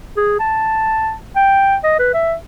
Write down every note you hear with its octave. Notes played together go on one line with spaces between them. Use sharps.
G#4
A5
G5
D#5
B4
E5